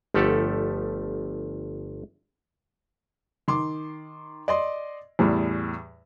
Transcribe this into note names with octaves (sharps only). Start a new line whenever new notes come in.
G1 F3 A3 G4 A4 F#5
D#3 C6 D6
D5 D#5 C6
E2 A2 G3